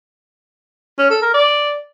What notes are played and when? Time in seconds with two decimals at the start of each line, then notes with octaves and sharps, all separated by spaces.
0.99 C#4
1.10 A4
1.22 A#4
1.34 D5